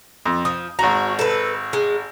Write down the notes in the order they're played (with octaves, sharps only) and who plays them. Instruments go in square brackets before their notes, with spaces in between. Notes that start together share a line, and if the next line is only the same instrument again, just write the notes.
[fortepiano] F2
[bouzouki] F3 [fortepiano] D#6
[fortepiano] G#1 A#5 [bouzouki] F#4
[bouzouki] A4 B4
G#3